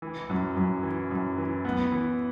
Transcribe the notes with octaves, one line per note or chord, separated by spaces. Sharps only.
E3
F#2
F#2
E3
F#2
E3
B3
E3